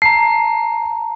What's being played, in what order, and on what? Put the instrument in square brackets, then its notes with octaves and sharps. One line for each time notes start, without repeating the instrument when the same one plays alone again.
[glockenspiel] A5 A#5 [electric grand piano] C7